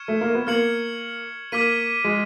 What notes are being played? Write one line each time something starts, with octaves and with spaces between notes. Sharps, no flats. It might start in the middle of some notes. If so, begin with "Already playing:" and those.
Already playing: C#6 F6 G#6 C#7 E7
A3
A#3
B3
A#3 F6 G#6 C#7 F#7
A#3 D6 F6 G#6 B6 D#7
G#3